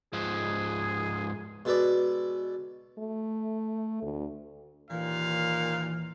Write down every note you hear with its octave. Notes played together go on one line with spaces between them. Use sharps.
G#2 F3 G#4
B2 G#3 A4 B4 D5
A3
D2
D#2 A#2 E3 F5